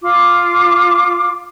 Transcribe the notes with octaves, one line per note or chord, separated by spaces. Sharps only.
F4 D6